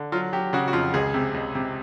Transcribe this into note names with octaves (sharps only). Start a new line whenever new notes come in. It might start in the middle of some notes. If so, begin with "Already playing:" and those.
Already playing: D3
F#3 F4
F#3 G4
C#3 F#4
F#4
F2 F4
C#2 G#4
C3
C#2
C3